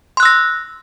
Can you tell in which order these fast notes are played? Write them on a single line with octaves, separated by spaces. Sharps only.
C6 F#6 E6 A#6